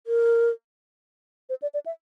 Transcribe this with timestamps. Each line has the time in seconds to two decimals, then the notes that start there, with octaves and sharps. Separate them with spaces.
0.07 A#4
1.49 C5
1.62 D5
1.74 D5
1.86 E5